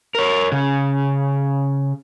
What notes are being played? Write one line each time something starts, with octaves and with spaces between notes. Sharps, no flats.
A#4 C#5
C#3 C#4